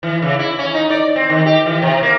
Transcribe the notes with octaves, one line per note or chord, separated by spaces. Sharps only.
E3
C#3
E4
C#4
D#4
D5
C4
D#3
G4
E3
C3
A#3